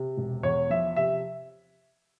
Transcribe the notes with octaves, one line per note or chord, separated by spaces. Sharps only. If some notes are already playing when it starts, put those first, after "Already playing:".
Already playing: C3
E1
E2 C#5
F3 E5
C3 E5